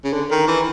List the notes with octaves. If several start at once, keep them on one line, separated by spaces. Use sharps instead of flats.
C#3
D3
D#3
E3